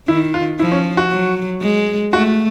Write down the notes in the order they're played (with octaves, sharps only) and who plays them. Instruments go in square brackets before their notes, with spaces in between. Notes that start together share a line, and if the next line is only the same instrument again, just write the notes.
[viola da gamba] D#3 [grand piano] E4
[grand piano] F4
[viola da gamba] F3 [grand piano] E4
[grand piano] C#4
F#4
[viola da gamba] F#3
G#3
[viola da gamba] A3 [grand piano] F#4